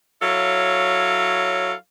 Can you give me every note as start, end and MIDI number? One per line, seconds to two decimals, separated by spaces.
0.22 1.73 54
0.22 1.73 64
0.22 1.73 69
0.22 1.73 73
0.22 1.73 77